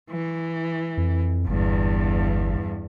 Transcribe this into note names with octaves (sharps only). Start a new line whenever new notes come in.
E3
F2
G1 E2 G2